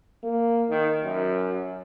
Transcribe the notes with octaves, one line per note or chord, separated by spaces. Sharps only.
A#3
D#3
F#2